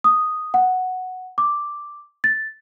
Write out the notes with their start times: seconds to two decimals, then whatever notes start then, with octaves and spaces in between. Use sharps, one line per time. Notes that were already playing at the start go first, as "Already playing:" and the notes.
0.04 D#6
0.54 F#5
1.38 D6
2.24 A6